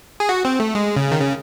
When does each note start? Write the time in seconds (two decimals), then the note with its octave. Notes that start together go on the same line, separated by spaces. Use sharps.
0.20 G#4
0.29 F#4
0.45 C4
0.60 A3
0.75 G#3
0.96 C#3
1.12 D#3
1.20 C#3